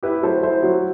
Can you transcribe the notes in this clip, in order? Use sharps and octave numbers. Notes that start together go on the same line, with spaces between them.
E4 G4 B4
F#3 A4 C5
E4 C5 E5
F#3